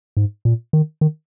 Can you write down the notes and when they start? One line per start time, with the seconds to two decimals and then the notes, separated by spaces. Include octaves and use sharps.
0.17 G#2
0.45 A#2
0.73 D#3
1.01 D#3